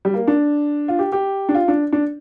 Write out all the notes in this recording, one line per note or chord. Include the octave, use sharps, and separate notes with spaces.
G3
A#3
D4
F4
G4
G4
D4
F4
D4
D4